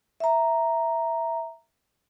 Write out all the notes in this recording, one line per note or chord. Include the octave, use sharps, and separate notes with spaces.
E5 A#5